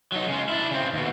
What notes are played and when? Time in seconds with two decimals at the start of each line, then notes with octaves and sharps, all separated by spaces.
0.12 F#3 D#4
0.28 C#3 G#3
0.49 D4 E4
0.71 C#3 C4
0.93 D#2 B2